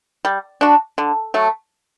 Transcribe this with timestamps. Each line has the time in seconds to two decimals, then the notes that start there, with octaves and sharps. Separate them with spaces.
0.25 G3
0.61 D4 F#4
0.98 D3
1.34 F#3 A3